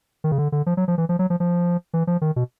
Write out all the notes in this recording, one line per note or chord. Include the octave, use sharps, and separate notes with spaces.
D#3
C#3
D3
D3
F3
F#3
F3
E3
F3
F#3
F3
F3
E3
F3
D#3
B2